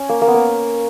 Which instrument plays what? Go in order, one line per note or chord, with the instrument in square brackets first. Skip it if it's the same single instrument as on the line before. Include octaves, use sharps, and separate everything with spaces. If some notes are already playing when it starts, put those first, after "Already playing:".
Already playing: [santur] C#4
A#3
A#3
B3
A#3